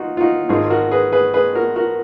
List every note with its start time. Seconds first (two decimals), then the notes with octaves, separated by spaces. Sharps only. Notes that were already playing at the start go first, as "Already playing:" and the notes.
Already playing: D#4 F4 F#4
0.17 F4
0.21 D#4 F#4
0.49 G#1 G#2 D#3 F4 G#4
0.70 F#4 A#4
0.91 G#4 B4
1.12 G#4 B4
1.34 G#4 B4
1.55 F#4 A#4
1.76 F#4 A#4